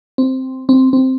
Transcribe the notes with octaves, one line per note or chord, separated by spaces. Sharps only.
C4
C4
C4